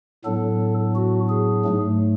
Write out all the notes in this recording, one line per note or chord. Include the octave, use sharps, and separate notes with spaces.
A2 F#3 B3 D4 A4
F#4
G#4
G#2 F#3 A3